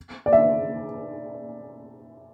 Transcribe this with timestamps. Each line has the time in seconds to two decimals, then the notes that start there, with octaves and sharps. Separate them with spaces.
0.26 D5
0.33 E5